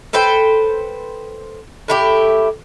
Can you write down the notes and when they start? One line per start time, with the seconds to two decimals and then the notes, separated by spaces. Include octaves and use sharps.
0.13 A4 B4 C5 G5
1.88 A2 E4 G4